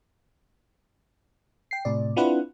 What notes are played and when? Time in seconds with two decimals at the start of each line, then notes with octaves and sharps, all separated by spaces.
1.71 G5 C7
1.85 A2 C3 D5
2.16 C4 D4 E4 F4 B4 F#5